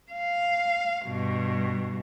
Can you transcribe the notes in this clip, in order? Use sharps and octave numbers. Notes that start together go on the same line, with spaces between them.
F5
G2 B2